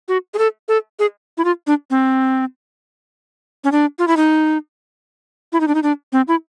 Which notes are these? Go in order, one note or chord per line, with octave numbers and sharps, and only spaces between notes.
F#4
G#4
A4
A4
G#4
E4
F4
D4
C4
C#4
D4
F4
E4
D#4
E4
D#4
D4
D#4
D4
C4
E4